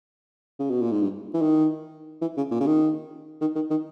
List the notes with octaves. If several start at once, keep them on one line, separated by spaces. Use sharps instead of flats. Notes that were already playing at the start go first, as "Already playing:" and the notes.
C#3
B2
A#2
G#2
G2
E3
D#3
E3
C#3
A#2
C#3
D#3
D#3
D#3
D#3